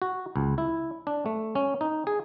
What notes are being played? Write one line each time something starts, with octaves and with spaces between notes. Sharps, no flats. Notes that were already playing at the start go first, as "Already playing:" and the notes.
F#4
C#2
E4
D4
A3
C#4
D#4
G#4